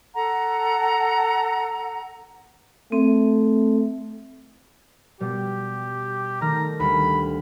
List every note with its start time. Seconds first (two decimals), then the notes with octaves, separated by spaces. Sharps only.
0.15 A4 F#5 A#5
2.92 A3 C4
5.21 B2 G3 G4
6.41 D#3 A3 A#5 F6
6.80 D2 G3 B5